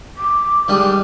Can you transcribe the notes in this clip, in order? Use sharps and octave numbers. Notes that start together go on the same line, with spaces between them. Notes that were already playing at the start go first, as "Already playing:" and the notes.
D6
D#3 G3 G#3